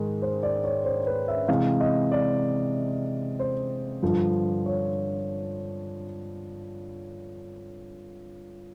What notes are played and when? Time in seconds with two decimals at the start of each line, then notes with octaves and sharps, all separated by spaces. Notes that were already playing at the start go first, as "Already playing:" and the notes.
Already playing: G#2 D#3 G#3
0.22 C5
0.43 D5
0.64 C#5
0.85 C5
1.06 B4
1.28 E5
1.48 C3 E3 G#3 F5
1.81 D#5
2.12 D5
3.39 C5
4.03 G2 D3 F3
4.66 C#5